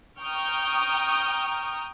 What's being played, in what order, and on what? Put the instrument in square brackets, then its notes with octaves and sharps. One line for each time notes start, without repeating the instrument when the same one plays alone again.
[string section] G5 A#5 C#6 D#6 F6 G6